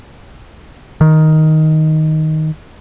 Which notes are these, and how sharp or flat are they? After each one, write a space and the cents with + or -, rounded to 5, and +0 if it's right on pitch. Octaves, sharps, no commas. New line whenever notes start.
D#3 +5